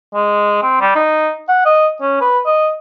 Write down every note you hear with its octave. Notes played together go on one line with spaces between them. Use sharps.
G#3
C4
G3
D#4
F#5
D#5
C#4
B4
D#5